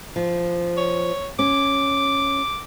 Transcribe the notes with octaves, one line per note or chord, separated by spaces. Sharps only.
F3
C#5
C#4 D6